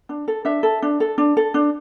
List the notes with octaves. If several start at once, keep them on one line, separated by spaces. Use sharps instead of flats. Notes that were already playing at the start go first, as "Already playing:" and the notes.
D4
A4
D4 E5
A4
D4
A4
D4
A4
D4